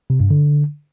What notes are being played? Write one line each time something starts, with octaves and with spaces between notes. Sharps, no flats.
C3
G2
D3